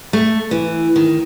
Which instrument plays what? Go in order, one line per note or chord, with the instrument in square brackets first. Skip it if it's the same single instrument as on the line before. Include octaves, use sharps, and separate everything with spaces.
[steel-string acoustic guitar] A3
E3
D#3